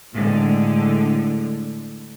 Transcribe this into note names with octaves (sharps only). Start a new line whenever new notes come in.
A2 D3 G#3